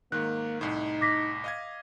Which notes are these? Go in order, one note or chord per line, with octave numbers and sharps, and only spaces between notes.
G#2 D#3 A#3 F#6
C2 A2 D#4
D6 A#6 B6
D#5 F5 G#6